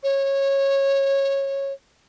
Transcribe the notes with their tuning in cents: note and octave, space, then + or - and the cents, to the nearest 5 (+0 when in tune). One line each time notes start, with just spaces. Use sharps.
C#5 -15